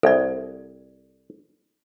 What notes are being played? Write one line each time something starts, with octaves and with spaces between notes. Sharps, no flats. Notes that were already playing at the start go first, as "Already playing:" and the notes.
C2 A4 D5